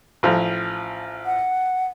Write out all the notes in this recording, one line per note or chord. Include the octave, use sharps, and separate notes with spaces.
A1 F3
F#5